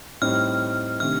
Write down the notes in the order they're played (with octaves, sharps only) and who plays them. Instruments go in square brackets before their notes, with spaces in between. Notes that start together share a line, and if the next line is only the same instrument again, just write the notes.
[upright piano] A2 G3 C4 D#4 [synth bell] F6
[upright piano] C3 D#3 A3 D4 [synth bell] F6